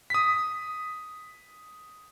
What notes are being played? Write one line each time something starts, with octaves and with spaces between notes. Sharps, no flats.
D#6 B6